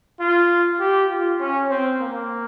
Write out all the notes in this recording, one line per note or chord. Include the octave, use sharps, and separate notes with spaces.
F4
G4
F4
C#4
C4
A#3